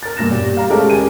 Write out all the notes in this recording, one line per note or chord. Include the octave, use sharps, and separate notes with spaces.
A#4 A6
E1 G2 A#2 A#6 E7
G4 D5
F5 A#5
G#3 A3 C#4 G4 A4 A#4
C#2 G#5 D#7